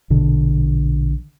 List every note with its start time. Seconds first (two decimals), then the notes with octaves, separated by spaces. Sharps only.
0.10 A#1 B2 D3